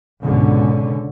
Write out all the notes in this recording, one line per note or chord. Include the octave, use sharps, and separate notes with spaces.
C#2 G#2 B2 D3 C#4